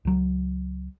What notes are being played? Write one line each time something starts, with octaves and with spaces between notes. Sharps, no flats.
C#2 F#3